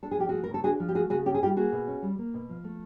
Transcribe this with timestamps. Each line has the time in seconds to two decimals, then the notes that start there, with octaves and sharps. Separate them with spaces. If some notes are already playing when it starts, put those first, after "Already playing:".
0.03 D4 A4
0.11 G#4
0.18 F3 G4
0.29 A3 F#4 G#4
0.44 A#4
0.49 C#3
0.54 A4
0.64 D4 F#4 G#4
0.80 F3
0.89 G4
0.95 A3 F#4 G#4
1.10 C#3 F#4 G#4
1.26 C#4 G4
1.34 G#4
1.42 G3 F4 G4
1.57 A#3 F#4 G#4
1.72 B2
1.87 C#4
2.02 G3
2.18 A#3
2.34 B2
2.49 F3
2.64 A3